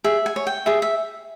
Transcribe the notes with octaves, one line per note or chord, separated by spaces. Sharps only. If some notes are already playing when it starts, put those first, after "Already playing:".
G#4 E5
G#5
C#5
G5
G#4 E5
E5